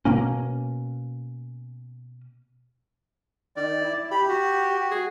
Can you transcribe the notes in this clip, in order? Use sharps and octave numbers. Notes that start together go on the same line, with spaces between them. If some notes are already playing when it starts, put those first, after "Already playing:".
B2 A#3 C#4
D#3 D5
E4
G4 B5
F#4
G#4